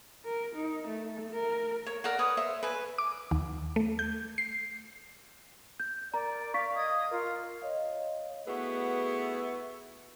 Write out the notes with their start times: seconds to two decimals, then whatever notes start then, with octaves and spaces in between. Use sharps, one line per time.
0.25 A#4
0.55 D#4
0.87 A3
1.33 A#4
1.86 C#5
2.04 A#4 D5 F#5
2.19 B4 C#5 D#6
2.37 C5 C#5 E5
2.63 B4 G#5
2.98 D6
3.31 D#2
3.76 A3
3.99 G6
4.38 C7
5.80 G6
6.14 A#4 D5 A#5
6.54 F5 C#6 B6
6.75 D#5 D#6 G#6
7.11 F4 A#4
7.62 C#5 D#5 F5
8.46 A3 B3 E4 F#4 G#4 B4